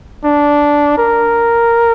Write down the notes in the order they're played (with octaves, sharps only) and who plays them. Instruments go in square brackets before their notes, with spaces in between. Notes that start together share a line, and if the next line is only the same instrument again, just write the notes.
[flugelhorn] D4
A#4